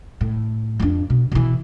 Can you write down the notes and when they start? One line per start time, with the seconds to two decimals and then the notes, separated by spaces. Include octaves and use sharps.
0.21 A2
0.80 F2 D4
1.10 B2
1.31 B2 E3